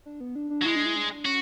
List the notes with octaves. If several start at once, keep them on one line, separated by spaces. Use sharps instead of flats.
D4
B3
D4
D4
F#3
G#3 E4
D4
E4
D4
C#4 F#4